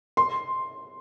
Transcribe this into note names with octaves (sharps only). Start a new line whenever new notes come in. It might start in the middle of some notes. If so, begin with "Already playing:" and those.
C6